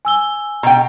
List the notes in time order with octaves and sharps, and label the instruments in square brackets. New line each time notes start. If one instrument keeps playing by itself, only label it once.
[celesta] G#5 E6 G7
[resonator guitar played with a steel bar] B2 G5 [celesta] A#5